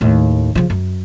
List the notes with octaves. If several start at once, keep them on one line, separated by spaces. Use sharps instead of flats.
D#2 A2
C#3 F3
F#2